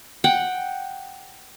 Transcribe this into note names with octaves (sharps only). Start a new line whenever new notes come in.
F#5 G5